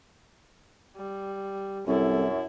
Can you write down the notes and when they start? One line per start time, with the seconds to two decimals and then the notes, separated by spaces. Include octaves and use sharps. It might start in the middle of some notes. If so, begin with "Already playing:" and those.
0.97 G3
1.87 C2 F#2 E4 A4